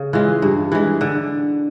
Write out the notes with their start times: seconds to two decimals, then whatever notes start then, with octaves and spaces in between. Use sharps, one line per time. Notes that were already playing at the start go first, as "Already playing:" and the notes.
Already playing: C#3
0.13 E3 G#3 F4
0.42 G2
0.72 E3 G#3
1.01 D3